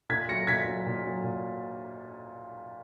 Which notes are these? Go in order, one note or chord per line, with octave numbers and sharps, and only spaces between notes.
A#2 G#6 B6
F#3 A#6 C#7
A#2 G#6 B6
F#3
A#2
F#3
A#2